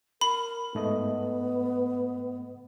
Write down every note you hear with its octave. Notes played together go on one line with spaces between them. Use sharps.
A#4 B5
G#2 A3 B3 D#5